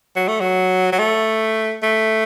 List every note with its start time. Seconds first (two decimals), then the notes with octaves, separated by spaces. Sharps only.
0.16 F#3
0.28 A3
0.40 F#3
0.92 F#3
0.99 A3
1.83 A3